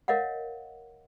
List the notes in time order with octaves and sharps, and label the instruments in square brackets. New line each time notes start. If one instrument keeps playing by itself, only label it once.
[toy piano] A#4 C#5 D#5 F5 F#5